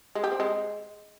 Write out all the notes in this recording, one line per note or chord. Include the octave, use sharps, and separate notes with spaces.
G#3
G4
C4
G#3